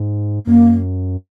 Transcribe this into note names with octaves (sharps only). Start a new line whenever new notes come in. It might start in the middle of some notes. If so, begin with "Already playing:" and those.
Already playing: G#2
F#2 A#3